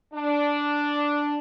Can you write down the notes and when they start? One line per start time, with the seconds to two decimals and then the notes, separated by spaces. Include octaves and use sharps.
0.14 D4